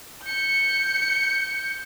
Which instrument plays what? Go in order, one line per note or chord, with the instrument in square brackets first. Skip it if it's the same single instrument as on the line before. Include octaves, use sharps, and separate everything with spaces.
[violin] G6 C#7